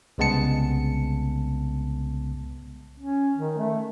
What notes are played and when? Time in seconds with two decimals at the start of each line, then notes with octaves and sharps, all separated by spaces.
0.18 C2 C#3 G#3 B3 A5 C#7
2.99 C#4
3.37 D#3
3.58 A3